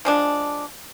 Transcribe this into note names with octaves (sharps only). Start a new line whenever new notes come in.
F3 G#3 D4